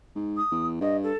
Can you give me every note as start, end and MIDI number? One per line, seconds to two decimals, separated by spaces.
0.15 0.40 44
0.37 0.67 87
0.52 0.81 40
0.81 1.11 43
0.81 0.97 75
1.03 1.17 69